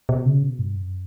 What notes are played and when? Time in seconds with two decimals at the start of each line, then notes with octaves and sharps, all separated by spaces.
0.09 B2
0.26 C#3
0.43 B2
0.59 G2
0.76 F#2